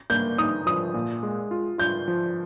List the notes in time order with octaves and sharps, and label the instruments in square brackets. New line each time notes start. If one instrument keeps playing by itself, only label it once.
[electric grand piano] A#3 [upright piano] G6
[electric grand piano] D#4 [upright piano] D#6
[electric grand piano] F3 [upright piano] D#6
[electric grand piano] A#2
G#3
F4
[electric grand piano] F4 [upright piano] G6
[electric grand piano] F3